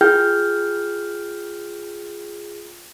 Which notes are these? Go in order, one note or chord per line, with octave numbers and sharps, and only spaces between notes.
F4 G#4 G5 F6 G6